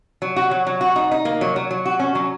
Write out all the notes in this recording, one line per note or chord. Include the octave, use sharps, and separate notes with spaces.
F#3
F#4
F#3
F#3
F#4
D#4
D#4
A#3
F#3
F#3
F#3
F#4
C#4
F#3